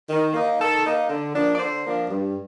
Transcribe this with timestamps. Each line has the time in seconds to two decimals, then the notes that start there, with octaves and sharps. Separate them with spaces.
0.10 D#3
0.34 A#3 D#4
0.59 D#3 A4
0.85 A#3 D#4
1.09 D3
1.34 F3 A#3 D4
1.55 D5
1.59 D3 C5
1.84 F3 A#3 D4
2.09 G2